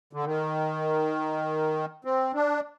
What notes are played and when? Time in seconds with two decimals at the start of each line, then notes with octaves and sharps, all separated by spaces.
0.13 D3
0.24 D#3
2.05 C4
2.34 D4